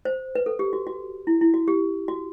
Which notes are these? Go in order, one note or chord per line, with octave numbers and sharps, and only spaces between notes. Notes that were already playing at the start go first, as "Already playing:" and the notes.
C5
B4
A4
G4
F#4
F#4
E4
E4
F#4
G4
F#4